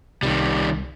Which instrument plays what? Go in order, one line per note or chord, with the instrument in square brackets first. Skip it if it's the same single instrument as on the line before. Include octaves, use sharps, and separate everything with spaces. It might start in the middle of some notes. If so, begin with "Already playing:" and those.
[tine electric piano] C2 [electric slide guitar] D#3 G3